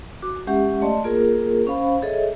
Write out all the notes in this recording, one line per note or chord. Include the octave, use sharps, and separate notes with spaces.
F#4 D6
G#3 C#4 G4 E5 F#5
A3 D5 D#5 A5 C6
A#3 F4 G#4 A#4
C#4 C5 F5 B5
G#4 A4 C#5 D#5 E5